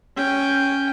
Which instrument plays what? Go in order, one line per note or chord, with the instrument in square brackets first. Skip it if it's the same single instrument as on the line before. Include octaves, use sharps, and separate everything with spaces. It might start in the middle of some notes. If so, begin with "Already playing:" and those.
[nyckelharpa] C#4 G5